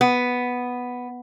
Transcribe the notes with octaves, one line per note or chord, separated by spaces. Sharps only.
B3